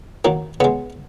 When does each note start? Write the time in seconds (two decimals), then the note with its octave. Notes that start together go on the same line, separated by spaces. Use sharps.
0.25 D#3 F#3 A#3
0.60 C#3 G#3 B3